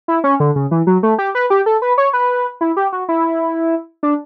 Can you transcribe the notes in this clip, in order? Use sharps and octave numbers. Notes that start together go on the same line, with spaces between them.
E4
C#4
D3
C#3
E3
F#3
A3
G4
B4
G4
A4
B4
C#5
B4
E4
G4
F#4
E4
D4